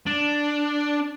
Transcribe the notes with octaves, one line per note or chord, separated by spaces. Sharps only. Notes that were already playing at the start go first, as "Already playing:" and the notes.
D4